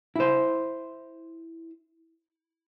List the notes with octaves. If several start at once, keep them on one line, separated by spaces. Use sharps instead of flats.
E4 C5